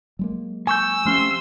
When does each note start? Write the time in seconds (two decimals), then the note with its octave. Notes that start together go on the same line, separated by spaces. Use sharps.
0.19 F#3 G#3 A#3
0.67 G#5 C#6 E6 G6
1.05 C3 F3 A3 C#4 F5 C6